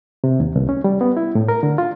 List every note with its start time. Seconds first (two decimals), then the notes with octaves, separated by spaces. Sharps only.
0.24 C3
0.40 D#2
0.56 C2
0.69 C#4
0.84 G3
1.01 B3
1.17 E4
1.35 A2
1.49 A#4
1.63 D3
1.78 F4